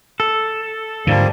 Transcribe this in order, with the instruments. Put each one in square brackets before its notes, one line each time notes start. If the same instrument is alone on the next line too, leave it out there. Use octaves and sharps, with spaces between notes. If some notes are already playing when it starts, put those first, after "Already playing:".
[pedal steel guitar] A4
[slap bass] G#2 D3 [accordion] F3 G3 A#3